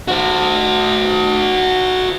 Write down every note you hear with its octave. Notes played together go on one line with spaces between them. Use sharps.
F#4 C5